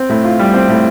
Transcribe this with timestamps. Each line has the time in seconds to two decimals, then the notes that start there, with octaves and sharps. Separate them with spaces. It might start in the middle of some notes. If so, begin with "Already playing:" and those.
Already playing: C4
0.09 A2
0.24 F4
0.39 G3
0.53 C4
0.69 A2